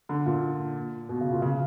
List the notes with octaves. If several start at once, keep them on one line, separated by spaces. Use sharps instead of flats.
D3
A#2
B2
C#3
A#2
C#3